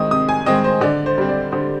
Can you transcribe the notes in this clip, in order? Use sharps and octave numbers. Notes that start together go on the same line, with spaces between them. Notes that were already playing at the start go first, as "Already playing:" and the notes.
Already playing: D#3 G#3 C4 D#6
C3 D#6
G#5
D#3 G#3 C4 D#5
C5
D3 D5
C5
G3 C4
D5
D3 C5